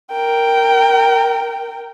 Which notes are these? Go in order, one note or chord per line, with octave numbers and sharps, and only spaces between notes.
A#4 G5